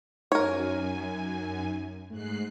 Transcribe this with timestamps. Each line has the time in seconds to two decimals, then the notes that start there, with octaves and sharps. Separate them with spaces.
0.32 F#2 D#4 A#4 C#5 G#5
2.10 G#2 A3 F#6 C7